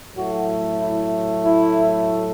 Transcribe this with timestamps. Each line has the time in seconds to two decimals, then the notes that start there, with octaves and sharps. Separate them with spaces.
0.15 A2 F#3 A3 F#4
0.79 E4
1.42 E4